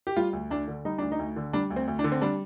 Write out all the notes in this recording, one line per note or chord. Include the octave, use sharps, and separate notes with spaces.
G4
G3 F4
D2
D2 D4
D3
G3 D#4
D2 D4
D#4
D2
D3
G3 D4
D2
C4
D2
D4
D3
C4
G3 D4